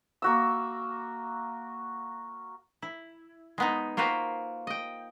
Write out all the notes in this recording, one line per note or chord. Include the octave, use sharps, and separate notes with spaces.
A#3 F#4 E6
E4
G#3 B3 D#4
A#3 F4 F#4 B4 C5 G5
D#5 G5